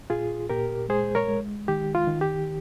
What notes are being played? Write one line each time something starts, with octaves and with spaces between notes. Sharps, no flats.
A#2 F4 G#4
A#2 G4 A#4
G#3 G#4 C5
A#4 C#5
G#3
D#3 G4
F4
D#3
G4